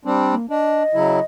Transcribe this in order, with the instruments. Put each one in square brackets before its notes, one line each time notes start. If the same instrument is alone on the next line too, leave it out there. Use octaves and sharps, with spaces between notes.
[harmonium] G3 C4 D4
[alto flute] A#3
[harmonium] D4 [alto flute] D#5
[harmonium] C#3 F#3 E4